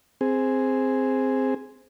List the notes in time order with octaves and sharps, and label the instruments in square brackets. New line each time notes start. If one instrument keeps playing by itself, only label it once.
[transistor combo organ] C4 G#4